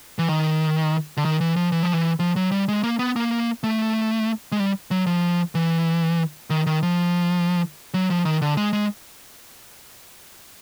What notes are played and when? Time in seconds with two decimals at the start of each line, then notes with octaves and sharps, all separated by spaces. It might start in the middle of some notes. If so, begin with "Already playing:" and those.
0.19 E3
0.29 D#3
1.17 D3
1.25 D#3
1.41 E3
1.56 F3
1.72 E3
1.83 F3
1.93 E3
2.19 F3
2.36 F#3
2.52 G3
2.68 G#3
2.83 A#3
2.99 B3
3.16 A#3
3.63 A3
4.52 G#3
4.60 G3
4.91 F#3
5.07 F3
5.55 E3
6.50 D#3
6.66 D#3
6.83 F3
7.94 F#3
8.10 F3
8.25 D#3
8.42 D3
8.57 G#3
8.73 G#3